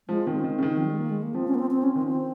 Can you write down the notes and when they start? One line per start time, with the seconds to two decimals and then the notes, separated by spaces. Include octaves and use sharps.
0.08 F3 G#3
0.27 D#3 C4
0.39 D#3 C#4
0.51 C4
0.58 C#3
0.63 D#3
0.77 F3
0.85 G3
0.91 G#3
0.98 A#3
1.10 G#3
1.23 A#3
1.35 F3 C4
1.48 C#4
1.55 A#3
1.59 C4
1.71 C4
1.83 C#4
1.95 D#3 C4
2.07 F3 C4